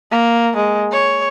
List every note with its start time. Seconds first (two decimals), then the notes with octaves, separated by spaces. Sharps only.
0.12 A#3
0.56 G#3
0.92 C#5